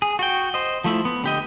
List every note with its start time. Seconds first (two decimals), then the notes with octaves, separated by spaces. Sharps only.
0.02 G#4
0.19 F#4 G5
0.54 C5 D#5
0.84 F3 A3 E4
1.05 B3
1.24 D3 G4 D#5